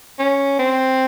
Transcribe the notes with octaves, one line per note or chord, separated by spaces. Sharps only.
C#4
C4